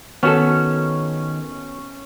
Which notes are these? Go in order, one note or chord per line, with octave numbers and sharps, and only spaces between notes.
D#3 B3 C#4 F#4 A4